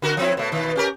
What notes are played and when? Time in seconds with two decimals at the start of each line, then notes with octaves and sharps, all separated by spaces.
0.02 D3 F#4 A#4
0.17 F3 C4 E4
0.37 B2 A3
0.52 B2 D#3
0.76 C#4 G4 A#4